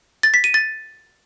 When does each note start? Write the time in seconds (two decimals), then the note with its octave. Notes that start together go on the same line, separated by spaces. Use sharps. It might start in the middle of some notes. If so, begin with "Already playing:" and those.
0.23 A6
0.34 B6
0.44 D#7
0.54 A6